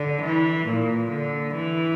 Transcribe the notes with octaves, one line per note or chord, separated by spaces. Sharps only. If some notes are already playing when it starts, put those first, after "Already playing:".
Already playing: D3
E3
A#2
D3
E3